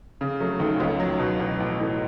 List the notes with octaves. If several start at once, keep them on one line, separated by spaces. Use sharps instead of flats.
C#3
F#3 A3
D#2 A3
C#2 C#4
F#3
B2
A1
A1
A2